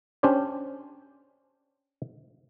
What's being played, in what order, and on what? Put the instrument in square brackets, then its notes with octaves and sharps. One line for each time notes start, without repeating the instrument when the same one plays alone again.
[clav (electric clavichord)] C#4 D4 G4 C5 D5